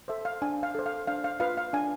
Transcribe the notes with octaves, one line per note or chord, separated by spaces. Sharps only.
A4 C5 E5
F5
D4 G#5
F5
A4 C5
F5
D4 F5
F5
F4 B4 F5
F5
D4 G#5